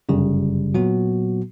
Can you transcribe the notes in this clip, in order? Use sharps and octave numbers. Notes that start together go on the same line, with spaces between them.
G1 F#2 C#3 G3
A#2 F#3 B3 F#4